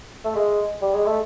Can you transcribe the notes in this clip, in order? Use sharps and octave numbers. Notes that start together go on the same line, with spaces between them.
A3
G#3
G3
G#3
A3